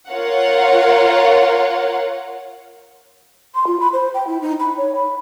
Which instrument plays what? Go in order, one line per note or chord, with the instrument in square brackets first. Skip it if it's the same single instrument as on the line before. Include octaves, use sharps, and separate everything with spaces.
[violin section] F4 A#4 C#5 F5 F#5
[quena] C6
F4
B5
C5
G5
E4
D#4
B5
C#5
B5